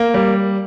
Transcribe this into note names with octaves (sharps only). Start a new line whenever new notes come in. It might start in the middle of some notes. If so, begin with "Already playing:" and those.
Already playing: A#3
G3